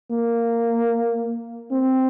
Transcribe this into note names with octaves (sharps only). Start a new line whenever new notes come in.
A#3
C4